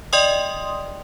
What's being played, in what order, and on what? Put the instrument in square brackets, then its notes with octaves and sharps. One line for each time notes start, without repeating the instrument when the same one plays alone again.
[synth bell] D5 D#5 G5 C6 D#6